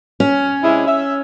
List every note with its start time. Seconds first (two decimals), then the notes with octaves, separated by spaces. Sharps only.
0.20 C#4
0.63 C3 G#3 E4
0.86 E5